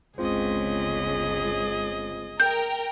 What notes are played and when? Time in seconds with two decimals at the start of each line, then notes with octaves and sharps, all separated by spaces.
0.18 G1 C#2 C4 F4 G#4 C5 D#5
2.40 A#4 G5 G6